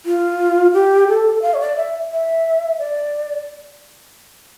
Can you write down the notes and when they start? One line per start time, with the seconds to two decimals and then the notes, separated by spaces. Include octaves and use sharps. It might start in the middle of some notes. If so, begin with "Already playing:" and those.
0.06 F4
0.74 G4
1.08 A4
1.42 F5
1.54 C#5
1.60 D5
1.77 E5
2.12 E5
2.79 D5